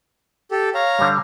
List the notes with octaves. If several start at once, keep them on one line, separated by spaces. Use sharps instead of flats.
G4 A4
C#5 F5 A#5
D3 G3